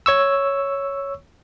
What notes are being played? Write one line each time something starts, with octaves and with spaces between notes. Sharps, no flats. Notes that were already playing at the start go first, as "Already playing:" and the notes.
C#5 C#6 E6